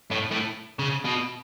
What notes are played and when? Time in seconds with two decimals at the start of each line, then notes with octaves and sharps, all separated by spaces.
0.11 A2
0.31 A2
0.79 C#3
1.05 B2